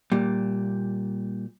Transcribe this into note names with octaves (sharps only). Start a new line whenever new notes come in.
A#2 G3